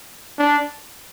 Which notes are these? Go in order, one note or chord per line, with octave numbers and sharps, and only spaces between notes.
D4